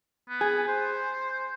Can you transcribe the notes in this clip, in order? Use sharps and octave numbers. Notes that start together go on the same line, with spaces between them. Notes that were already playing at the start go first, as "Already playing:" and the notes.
B3
G#4
C5